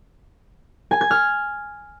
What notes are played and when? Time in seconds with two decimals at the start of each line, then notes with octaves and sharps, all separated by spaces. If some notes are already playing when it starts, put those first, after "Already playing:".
0.91 G#5
1.01 G#6
1.11 F6